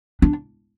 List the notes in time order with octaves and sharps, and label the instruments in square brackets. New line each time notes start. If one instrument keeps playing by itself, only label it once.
[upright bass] D4